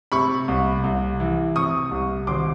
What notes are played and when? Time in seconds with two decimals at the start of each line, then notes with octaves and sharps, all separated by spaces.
0.12 C3 B5 C#6
0.48 C2
0.84 C2
1.20 E3
1.56 C3 C#6 D#6
1.91 C2
2.27 G#1 C6 D6